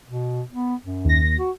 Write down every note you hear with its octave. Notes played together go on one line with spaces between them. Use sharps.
B2
B3
F#2
D#2 A#6
F#4